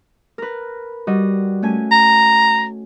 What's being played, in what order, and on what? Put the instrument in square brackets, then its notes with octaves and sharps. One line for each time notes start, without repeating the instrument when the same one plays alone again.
[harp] A#4 B4
G3 F#4 D#5
A3 C#4 G#5
[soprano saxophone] A#5